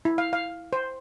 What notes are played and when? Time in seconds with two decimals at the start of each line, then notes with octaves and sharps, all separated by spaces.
0.05 E4
0.18 F5
0.33 F5
0.73 C5